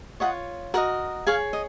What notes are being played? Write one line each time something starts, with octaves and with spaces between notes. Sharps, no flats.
F4 G#4 C#5 D#5 F#5
F#4 A#4 D#5 F#5 A#5
G#4 C#5 F5 G#5
D#5